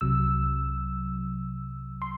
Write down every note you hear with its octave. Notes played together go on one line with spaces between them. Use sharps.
C2 C3 F#3 E6
C6